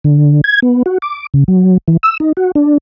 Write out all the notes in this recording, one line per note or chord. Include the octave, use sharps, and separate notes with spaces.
D3
G#6
B3
F#4
D6
C#3
F#3
E3
E6
D#4
F#4
D4